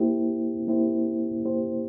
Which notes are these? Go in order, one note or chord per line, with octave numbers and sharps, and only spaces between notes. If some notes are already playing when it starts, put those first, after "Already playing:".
Already playing: A#3 E4 G4 C5
A#3 E4 G4 C5
A#3 E4 G4 C5